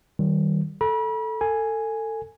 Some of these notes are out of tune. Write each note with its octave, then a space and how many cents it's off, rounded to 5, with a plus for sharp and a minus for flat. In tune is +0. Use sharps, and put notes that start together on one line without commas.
D#3 +0 G3 -30
A4 +0 B5 -40
A4 +25 G#5 +0